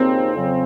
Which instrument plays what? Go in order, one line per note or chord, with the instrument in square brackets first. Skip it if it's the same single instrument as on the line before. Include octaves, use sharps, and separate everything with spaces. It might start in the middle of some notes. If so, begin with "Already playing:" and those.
Already playing: [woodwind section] D#2 C#3 F3 A#3 D#4 [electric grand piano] C4
[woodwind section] F2 C#3 F#3